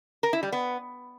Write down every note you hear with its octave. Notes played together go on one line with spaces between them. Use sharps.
A#4
E4
G3
B3